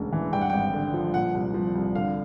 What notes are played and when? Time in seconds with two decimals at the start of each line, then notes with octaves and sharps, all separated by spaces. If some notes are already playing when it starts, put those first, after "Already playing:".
Already playing: E1 D2 C#3
0.12 E3
0.32 G2 G5
0.41 F#5
0.50 G#1 G5
0.74 D3
0.94 F3
1.14 A#2 F#5
1.35 C2
1.54 F3
1.75 C2
1.95 D3 F5